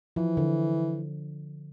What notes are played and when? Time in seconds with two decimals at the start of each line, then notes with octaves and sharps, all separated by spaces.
0.16 E3 F3
0.37 D3